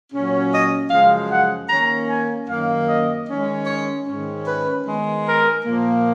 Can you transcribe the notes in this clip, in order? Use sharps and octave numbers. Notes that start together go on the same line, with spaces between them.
A#2 F#3 C#4
D#5
F#2 C#3 F3 G#3 F5
F#5
D#3 A#3 C#4 A#5
G#5
F#2 D#3 A#3 C#4 F5
D#5
D#3 G#3 C#4
C#5
G#2 D#3 G#3 C#4
B4
D#3 G#3 B3
A#4
A#2 F3 A#3